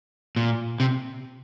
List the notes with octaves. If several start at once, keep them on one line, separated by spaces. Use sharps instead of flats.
A#2
C3